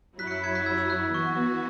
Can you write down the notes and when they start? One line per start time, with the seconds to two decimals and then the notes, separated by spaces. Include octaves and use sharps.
0.19 F#2 F#3 E4 F#6 B6
0.27 C#7
0.31 F#6 B6
0.44 G#6 C#7
0.55 F#6 B6
0.66 E6 G#6
0.78 E6
0.90 F#6
1.02 E6
1.14 E3 B3 F#4 C#6